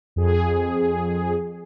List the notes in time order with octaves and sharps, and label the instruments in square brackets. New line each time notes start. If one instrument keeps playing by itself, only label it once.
[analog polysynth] F2 G#4